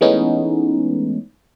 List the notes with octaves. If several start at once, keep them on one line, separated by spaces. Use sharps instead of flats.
E3 G#3 A3 B3 C#4 D#4